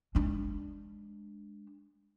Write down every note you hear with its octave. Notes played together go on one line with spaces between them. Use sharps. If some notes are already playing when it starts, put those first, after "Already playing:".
G#3 D4